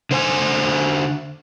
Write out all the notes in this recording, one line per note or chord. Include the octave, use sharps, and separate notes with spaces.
D3 C5 G#5